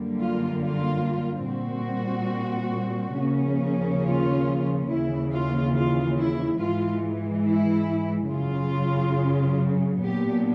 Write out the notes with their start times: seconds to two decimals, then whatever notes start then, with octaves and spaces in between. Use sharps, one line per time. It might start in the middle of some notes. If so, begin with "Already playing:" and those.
Already playing: F#2 D3 G3 A#3
0.18 F4
0.61 F4
1.46 A#2 G3 C4 F#4
3.17 D#2 C#3 F3 A#3 C#4
4.03 F4
4.88 D#2 C#3 E3 E4
5.31 F4
5.74 F4
6.17 E4
6.59 G#2 E3 G#3 F4
7.45 E4
8.31 F#2 C#3 F#3 F4
10.02 A#2 F#3 B3 D4 G4